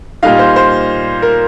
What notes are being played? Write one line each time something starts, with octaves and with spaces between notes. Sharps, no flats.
A#2 G3 D#4 F5
C5
C5
A#4